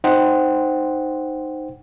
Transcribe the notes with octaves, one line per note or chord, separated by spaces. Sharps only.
D#4 C5 F#5 G5